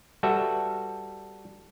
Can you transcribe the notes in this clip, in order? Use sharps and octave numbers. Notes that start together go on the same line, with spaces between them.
G3 F#4 A4 B4 E5